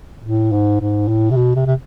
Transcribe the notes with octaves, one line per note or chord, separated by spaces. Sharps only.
A2
G#2
G#2
A2
C3
B2
C3
C3